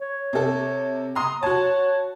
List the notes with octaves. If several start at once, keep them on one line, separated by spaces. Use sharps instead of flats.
C#5
C3 A4
A#5 C6 D#6
F#4 C#5 A5